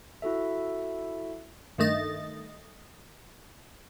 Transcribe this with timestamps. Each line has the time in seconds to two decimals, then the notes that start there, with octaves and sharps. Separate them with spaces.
0.22 E4 F#4 A4 E5
1.78 G2 D#3 A3 D#5 A6